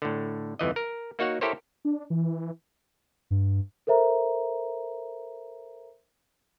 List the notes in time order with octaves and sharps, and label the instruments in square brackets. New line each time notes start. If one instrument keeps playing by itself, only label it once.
[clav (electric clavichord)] A2 D3
G1 F2 E3 D#5
A#4
A#3 D#4 F#4 C#5 F#5
E4 G4 A4 A#4 C5 C#5
[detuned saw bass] D4
E3
[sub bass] G2
[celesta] A4 A#4 C5 E5 A#5